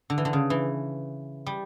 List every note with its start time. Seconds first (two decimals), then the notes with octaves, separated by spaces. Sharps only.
0.10 D3
0.18 E3
0.25 D3
0.33 C#3
0.50 E3
1.46 G3